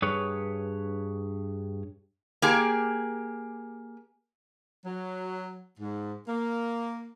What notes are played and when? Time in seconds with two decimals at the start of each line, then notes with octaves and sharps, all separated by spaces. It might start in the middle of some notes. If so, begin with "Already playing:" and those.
0.02 G2 G#4 B4 C#5
2.42 A#3 G4 G#4
4.85 F#3
5.80 G#2
6.28 A#3